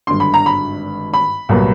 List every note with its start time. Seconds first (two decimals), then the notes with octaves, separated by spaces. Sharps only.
0.07 G#1 G2 D3 C6
0.20 B5
0.34 A#5
0.46 B5
1.14 B5
1.49 C2 A#2 F#3 B3